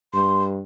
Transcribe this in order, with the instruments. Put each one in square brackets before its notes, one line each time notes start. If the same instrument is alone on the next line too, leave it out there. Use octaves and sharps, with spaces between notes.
[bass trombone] G2 [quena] C6